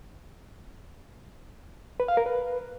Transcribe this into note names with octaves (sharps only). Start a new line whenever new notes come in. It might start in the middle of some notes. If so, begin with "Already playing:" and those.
B4
F5
A#4
B4